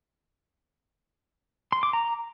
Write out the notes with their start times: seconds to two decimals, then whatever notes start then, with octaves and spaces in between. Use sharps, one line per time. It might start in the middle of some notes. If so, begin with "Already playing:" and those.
1.72 C6
1.83 D6
1.93 A#5